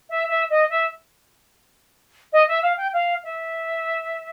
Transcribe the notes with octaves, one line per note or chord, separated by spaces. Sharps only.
E5
E5
D#5
E5
D#5
E5
F5
G5
F5
E5